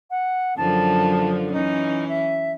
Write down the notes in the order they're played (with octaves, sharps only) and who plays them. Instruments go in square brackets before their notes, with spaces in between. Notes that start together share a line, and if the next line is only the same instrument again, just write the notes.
[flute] F#5
[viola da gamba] F#2 D3 F3 [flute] A5
[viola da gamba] E3 C#4 [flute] D#4
[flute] E5